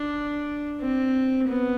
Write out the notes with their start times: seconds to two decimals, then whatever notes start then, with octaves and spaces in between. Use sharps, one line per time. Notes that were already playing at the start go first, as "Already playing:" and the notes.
Already playing: D4
0.80 C4
1.47 B3